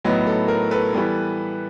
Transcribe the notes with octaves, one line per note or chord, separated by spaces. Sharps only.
A2 F#3 B3 D#4
A4
A#4
A4 B4
E3 G3 B3